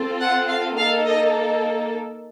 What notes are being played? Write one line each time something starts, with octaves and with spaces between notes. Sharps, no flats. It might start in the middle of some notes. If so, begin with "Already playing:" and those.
Already playing: C4 F4 A4
F#5
F5
A#3 D#4 A4 F5
D#5